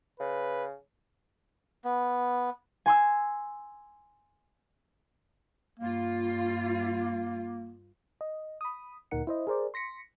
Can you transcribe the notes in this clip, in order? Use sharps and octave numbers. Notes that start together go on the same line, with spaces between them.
C#3 B4
B3
G#5 C6 E6
G2 A#3 F4
D#5
B5 D#6
D2 A#2 D#4 A#4 F#5 C#7
E4 C5 D#5
G#4 A#4 C5 D5
C6 A#6 B6 C#7